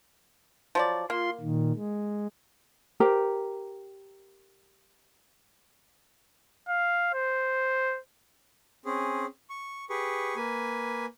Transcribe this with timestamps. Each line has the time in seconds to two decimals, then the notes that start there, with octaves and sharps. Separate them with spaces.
0.75 F3 F#3 D5
1.10 A#3 F4 C6
1.41 A#2 D#3
1.75 G#3
3.00 G4 A#4 C5 A#5
6.69 F5
7.14 C5
8.85 C4 C#4 G#4
9.50 C#6
9.90 G4 G#4 B4 C#6
10.36 A#3 B4 G#5